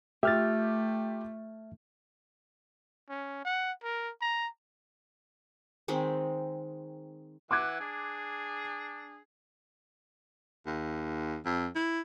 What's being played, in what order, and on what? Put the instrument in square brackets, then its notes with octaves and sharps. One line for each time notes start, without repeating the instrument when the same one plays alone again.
[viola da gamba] A3 [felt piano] F4 G4 [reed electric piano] E5 F6 A6
[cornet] C#4
F#5
A#4
A#5
[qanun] D#3 G#3 C4 B5
[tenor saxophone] E3 [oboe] F#5 [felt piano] D6 F#6 G#6
[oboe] D4 [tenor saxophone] G#4
[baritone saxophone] D#2
F2
E4